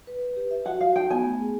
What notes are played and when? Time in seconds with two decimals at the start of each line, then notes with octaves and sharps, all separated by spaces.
0.07 B4
0.22 B4
0.36 G4
0.51 E5
0.65 F#4 F#5
0.80 F#4 F5
0.96 D#4 G5
1.10 B3 G#5
1.24 A3
1.40 G#4